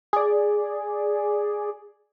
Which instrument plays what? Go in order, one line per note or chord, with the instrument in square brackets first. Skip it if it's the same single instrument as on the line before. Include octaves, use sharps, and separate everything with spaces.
[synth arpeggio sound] G#4 D5